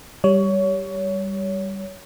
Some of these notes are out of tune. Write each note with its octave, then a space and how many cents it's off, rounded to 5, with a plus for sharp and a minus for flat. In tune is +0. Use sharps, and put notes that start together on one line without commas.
G3 +0 C#5 +20